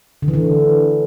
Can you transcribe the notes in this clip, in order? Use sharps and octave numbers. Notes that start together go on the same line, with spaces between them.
D3
E3
D3